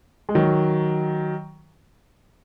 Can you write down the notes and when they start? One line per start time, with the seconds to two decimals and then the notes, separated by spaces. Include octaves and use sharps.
0.29 G#3
0.35 D#3 F#3